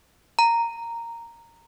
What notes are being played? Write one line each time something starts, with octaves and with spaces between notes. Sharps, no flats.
A#5